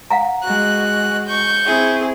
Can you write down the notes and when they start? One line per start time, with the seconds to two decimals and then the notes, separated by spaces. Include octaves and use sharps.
0.10 F5 F#5 A#5
0.44 G#3 F#4 F#6
1.28 C#6 G6
1.66 C4 E4 G#4